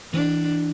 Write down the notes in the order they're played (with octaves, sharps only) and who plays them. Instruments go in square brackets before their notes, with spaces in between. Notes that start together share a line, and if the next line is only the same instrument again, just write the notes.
[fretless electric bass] E3 [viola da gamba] D4